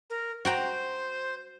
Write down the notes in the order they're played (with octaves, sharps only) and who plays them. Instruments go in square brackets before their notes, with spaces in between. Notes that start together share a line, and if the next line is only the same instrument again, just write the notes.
[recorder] A#4
[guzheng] F#4 G5 A#5 [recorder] C5